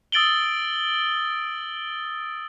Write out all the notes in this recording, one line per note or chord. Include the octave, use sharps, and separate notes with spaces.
D#6 E6 A6 D7 F#7 G7